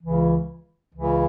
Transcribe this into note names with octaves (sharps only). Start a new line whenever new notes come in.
C#2 C#3 E3
C#2 C#3 E3